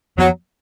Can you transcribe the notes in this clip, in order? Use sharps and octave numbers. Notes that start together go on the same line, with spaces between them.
F2 F3 F#3 B3